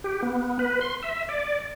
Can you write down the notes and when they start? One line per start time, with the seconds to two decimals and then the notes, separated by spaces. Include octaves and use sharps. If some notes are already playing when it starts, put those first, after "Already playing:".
0.04 G4
0.23 B3
0.59 B4
0.81 C6
1.03 E5
1.29 D5